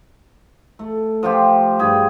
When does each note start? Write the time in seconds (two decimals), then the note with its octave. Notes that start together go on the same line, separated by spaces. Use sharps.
0.79 A3
1.23 F3 F4 G4
1.79 G2 G#4 G5